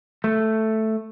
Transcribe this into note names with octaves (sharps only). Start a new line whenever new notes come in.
A3